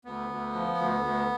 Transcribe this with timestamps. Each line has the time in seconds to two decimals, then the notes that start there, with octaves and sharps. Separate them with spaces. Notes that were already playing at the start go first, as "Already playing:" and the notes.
0.05 D2 B3
0.29 D2
0.53 F3
0.77 D2
1.01 D2